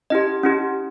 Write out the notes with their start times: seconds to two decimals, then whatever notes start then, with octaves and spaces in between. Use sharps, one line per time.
0.10 C#4 E4 G4 D#5
0.43 C#4 E4 G4